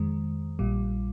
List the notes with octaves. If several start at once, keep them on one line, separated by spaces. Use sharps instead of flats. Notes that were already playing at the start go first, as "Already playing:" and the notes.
Already playing: F2 D#3 G#3
A#1 A#2 G3